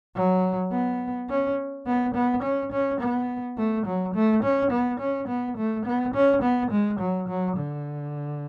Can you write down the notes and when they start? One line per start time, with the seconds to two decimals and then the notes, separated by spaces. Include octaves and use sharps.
0.15 F#3
0.72 B3
1.29 C#4
1.86 B3
2.14 B3
2.43 C#4
2.72 C#4
3.00 B3
3.57 A3
3.86 F#3
4.14 A3
4.43 C#4
4.71 B3
5.00 C#4
5.28 B3
5.57 A3
5.85 B3
6.14 C#4
6.43 B3
6.71 G#3
6.99 F#3
7.28 F#3
7.56 D3